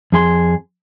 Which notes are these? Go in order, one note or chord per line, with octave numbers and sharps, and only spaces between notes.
F2 G#4 C6